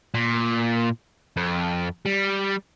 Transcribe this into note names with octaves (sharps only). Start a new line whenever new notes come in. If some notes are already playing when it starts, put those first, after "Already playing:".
A#2
F2
G3